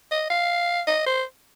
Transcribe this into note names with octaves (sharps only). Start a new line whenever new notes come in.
D#5
F5
D#5
C5